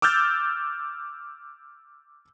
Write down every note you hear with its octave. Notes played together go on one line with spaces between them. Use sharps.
D6 E6 F6 G6 A6